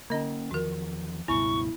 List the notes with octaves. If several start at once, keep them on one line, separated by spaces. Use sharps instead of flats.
D3 A#3 C#4 D#5 A#5
E2 D#3 F3 F#4 A#4
C#2 G2 B2 B3 E4 C#6